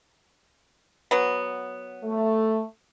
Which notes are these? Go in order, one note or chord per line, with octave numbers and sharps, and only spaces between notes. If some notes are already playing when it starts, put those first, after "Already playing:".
F#3 B3
A3